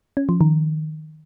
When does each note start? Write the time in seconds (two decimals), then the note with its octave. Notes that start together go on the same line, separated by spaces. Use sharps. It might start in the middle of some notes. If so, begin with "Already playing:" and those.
0.17 C#4
0.29 F3
0.41 D#3